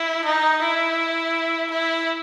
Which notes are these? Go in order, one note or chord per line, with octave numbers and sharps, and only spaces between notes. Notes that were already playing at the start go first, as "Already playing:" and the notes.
Already playing: E4
D#4
E4
E4